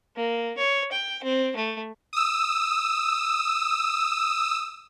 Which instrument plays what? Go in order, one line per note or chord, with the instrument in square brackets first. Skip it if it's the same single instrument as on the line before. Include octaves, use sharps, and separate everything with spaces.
[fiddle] A#3
C#5
G5
C4
A3
[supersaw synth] D#6 E6